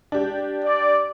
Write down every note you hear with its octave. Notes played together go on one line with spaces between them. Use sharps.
D4 G4
D5